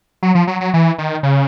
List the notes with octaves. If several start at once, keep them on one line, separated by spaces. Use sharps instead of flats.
F#3
F3
F#3
F#3
E3
D#3
C#3